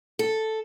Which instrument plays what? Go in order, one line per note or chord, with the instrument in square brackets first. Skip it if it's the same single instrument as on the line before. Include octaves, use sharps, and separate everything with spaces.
[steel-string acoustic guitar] A4